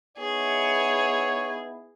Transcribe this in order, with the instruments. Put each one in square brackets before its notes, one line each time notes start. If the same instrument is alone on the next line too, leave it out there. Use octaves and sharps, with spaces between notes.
[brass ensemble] B3 D#4 E4 [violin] G#4 [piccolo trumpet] C#5